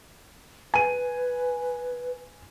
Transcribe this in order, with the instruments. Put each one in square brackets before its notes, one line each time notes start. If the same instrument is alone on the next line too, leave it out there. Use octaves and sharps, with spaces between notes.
[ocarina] B4 [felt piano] G#5 D#7